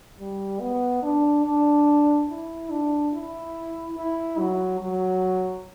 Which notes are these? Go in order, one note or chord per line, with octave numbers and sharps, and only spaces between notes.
G3
B3
D4
D4
E4
D4
E4
E4
F#3
F#3